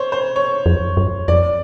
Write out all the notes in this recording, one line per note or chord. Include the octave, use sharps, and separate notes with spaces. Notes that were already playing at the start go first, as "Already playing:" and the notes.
Already playing: C5 C#5
C5
C#5
F2
F#2
F2 D5